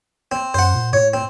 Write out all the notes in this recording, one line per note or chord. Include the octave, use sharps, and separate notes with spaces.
C4
F#2 C5 F#5
A#2
A2 C#5
C4